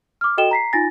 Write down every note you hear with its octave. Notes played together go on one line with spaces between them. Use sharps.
D6 F6
F#4 A4 D#5 G5 E7 G7
A#5 B6 C7
D#4 F4 G#5 A6 A#6